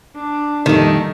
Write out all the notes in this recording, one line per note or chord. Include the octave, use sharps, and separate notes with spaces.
D4
F2 A#2 D#3 G3 A3 D#4 A4